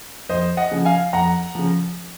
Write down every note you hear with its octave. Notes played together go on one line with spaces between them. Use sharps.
F2 C5 D#5
D#5 F#5
C#3 F3
F5 G#5
F2 F#5 A#5
C#3 F3